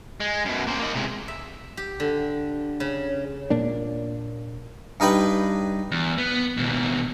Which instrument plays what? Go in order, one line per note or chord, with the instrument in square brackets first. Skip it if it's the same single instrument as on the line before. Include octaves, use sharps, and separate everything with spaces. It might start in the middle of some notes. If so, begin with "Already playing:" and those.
[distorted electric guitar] G#3
F#2 B2
A#3 C5
A#3 D#5
C3 G#3
[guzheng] E5
G4
D3
C#3
[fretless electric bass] A#2 A#3 D4
[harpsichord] G2 D#4 B4 G5 B5
[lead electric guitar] E2
B3
D#2 B2